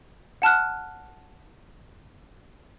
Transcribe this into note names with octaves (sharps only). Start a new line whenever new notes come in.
F#5 A5 F6 F#6